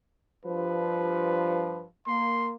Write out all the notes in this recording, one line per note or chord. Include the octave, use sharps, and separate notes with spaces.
G2 F3 B4
A#3 C6